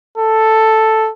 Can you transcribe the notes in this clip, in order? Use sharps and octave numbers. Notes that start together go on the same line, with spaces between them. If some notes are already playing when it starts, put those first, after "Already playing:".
A4